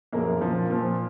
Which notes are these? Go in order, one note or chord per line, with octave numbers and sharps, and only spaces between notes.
F#2 C#3 F3 A#3 A#4
A#2 F3 F4
A#2 F3